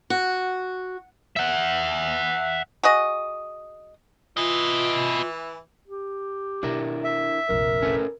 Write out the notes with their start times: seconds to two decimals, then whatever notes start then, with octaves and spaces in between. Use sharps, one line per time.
0.10 F#4
1.36 E5 F#5
2.83 F#4 G#4 D#5
4.37 E3 F4 B4 D#5
5.88 G4
6.63 B2 D4 E4 A#4
7.04 E5
7.49 F1 A#1 A#4
7.82 C#4 A4 B4